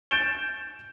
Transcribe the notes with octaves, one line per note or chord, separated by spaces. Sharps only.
G6 A6 D7 E7 G7